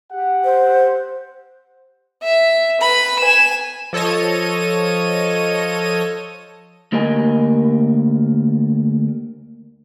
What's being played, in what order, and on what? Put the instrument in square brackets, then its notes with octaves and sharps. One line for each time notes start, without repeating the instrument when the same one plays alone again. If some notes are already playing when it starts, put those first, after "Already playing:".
[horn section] G4 F#5
[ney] C5
[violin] E5
B4 B5
G#5 E7
[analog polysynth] F3 A4 C#5 D#5 D#7
[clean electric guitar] D2 A#3 G4 A#4 D#5 G#5